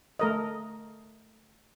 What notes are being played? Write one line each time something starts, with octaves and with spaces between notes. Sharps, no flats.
A3 A#4 D#5